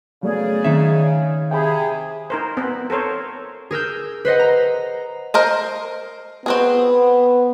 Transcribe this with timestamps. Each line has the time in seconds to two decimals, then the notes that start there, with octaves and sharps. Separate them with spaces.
0.23 C#3 F#3 A3 B3 G#4 D5
0.64 D#3 C4 D#4 E5
1.51 C3 G#4 G5 G#5 B5
2.30 D#4 A#4 C5
2.57 B3 C4 B4
2.90 A4 A#4 C5 C#5
3.71 G#4 A#4 E6 G6
4.25 B4 C5 D#5 F#5
4.39 A#5
5.34 A#4 C5 D#5
6.46 B3 C4 F#4 G#4